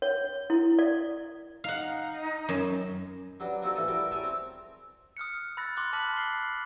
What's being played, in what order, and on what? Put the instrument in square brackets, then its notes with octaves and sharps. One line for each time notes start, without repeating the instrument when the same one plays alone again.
[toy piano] C#5
E4
D5
[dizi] D#4 [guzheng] F5 F#5
[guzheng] F#2
[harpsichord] F#3 G3 D4 F#4 B4
A#3 C4 D#4 F#4 G4 A4
A2 E3 E4 A4 D#6
E3 G3 F#4 A#4 D5
G#4 C#5 E5 G5 A5
C4
[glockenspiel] D#6 F6 F#6 C#7
B5 E6 F#6 A6 A#6
C6 D6 E6 F#6 A6
A5 B5 F6 B6 F#7
B5 F6 F#6 C7 G7